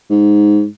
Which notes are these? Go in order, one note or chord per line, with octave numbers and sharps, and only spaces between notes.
G#2